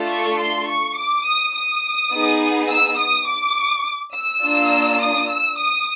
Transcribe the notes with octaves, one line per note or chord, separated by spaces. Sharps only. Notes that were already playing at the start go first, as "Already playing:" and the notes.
Already playing: A3 D4 F4 A4
C#6
C6
C#6
D6
D#6
D#6
B3 D#4 G#4
E6
D#6
D6
E6
A#3 D4 F4
D#6
E6
D#6